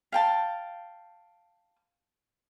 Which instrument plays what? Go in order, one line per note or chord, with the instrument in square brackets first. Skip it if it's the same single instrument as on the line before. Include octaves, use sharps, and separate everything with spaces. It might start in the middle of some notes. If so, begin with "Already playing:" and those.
[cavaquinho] F5 G5 A5